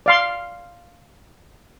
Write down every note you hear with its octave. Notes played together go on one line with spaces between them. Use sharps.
D5 F5 C6